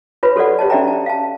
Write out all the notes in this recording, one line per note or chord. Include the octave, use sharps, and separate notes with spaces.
F4 B4 C#5 B5
F#4 A4 C#5 D5 F#5
G4 C#5 D#5 A5
C#4 D5 E5 G5 A#5
A5
F5 A5